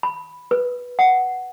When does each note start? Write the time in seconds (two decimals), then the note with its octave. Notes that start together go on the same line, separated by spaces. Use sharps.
0.03 B5
0.51 B4
0.99 F#5